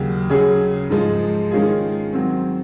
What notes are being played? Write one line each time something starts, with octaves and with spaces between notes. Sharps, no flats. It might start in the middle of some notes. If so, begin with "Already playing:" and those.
Already playing: D#2 C#3 F#3
C#3 F#3 C#4 G#4
G#2 F3 G#3
D#3 G#3 C#4 F4 G#4
D#3 F#3 C4